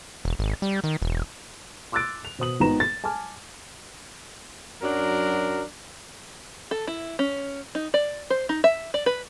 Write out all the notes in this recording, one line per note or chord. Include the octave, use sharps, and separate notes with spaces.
E1
G#1
G3
D#3
E1
C6 D6 E6 F#6 A6 D7
F7
B2 C5 D#6 F#7
G#1 D#3 B3 A#5 E7
A6
G#5 A5 D6 F6
F#2 F#3 D4 A#4
A4
E4
C#4
D#4
D5
C5
D#4
E5
D5
B4